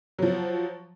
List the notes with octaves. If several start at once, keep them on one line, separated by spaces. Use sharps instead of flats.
F3 F#3